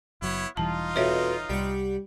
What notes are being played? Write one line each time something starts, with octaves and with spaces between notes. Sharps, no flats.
F#1 F#3 B3 E4 C#5
E1 E3 G3 D#4 F4 A5
F2 B2 B4 C#5 E5
C2 G3 F#5